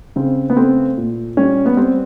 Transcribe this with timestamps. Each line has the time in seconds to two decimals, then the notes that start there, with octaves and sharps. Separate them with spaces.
0.16 C#3 C4
0.50 B3
0.57 A3 C4
0.98 A#2
1.37 G3 C#4
1.66 B3
1.77 G3 C4